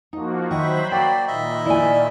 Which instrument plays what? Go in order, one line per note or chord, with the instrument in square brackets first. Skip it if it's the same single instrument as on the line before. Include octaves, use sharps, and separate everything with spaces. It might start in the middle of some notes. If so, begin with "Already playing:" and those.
[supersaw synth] F3 A#3 F#4 [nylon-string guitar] D#4
[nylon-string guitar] D#3 [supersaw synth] F#3 C5 B5 [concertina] E5 F#5 C#6
[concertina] A#3 F#4 D5 [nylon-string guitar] G5
[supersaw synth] A#2 D#3 [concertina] D#5 E5 B5
[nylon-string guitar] E4 G#5 [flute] D5